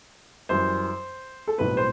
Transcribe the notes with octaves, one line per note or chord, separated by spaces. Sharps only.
F#2 E3 G3 C5
A4
B1 A2 G3 C4 B4
C5